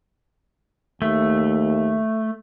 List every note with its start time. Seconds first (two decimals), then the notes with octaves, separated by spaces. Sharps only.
1.02 D#2 A3